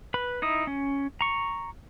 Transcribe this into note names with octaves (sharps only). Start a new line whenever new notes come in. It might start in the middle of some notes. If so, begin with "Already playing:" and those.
B4 B5
D#4 E4 D#6
C#4
A#5 C#6